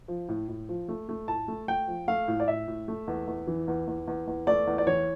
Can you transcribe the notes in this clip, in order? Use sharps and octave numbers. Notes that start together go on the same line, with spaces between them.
F3
A2
A2
F3
A3
A3
A2 A5
A3
A3 G5
F3
A3 F5
A2
D5
A2 E5
A2
A3
E2
E2
E3
E2
E2
E2
E2
A3 D5
E2
D5
E3 C#5